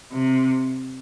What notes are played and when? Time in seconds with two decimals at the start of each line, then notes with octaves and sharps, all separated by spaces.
0.12 C3